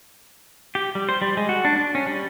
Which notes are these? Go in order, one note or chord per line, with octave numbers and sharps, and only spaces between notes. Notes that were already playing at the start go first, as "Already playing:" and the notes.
G4
G3
C5
G3
G#3
F#4
D4
D4
C#4
G3